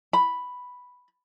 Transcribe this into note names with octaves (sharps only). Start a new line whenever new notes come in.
B5